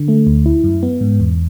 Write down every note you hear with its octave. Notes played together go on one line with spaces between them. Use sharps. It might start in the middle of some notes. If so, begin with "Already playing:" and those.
Already playing: D3
A3
D2
E4
F#2
B3
G#2
E2